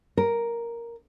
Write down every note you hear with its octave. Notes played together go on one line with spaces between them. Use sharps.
A#4